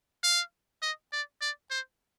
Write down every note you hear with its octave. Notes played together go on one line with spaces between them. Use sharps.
F5
D#5
D5
D5
C5